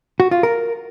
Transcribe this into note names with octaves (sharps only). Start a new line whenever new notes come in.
F#4
F4
A#4